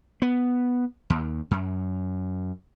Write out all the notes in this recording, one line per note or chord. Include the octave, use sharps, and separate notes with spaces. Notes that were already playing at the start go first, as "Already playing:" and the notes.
B3
D#2
F#2